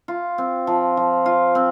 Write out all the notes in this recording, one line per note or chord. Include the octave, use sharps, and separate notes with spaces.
F4
C4
F3
F3
F4
C4